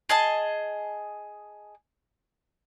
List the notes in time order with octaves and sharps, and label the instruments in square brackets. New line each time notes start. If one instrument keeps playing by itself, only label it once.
[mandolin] G#4 D#5 A5